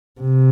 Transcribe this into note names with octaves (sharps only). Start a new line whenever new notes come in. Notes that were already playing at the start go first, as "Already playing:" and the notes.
C3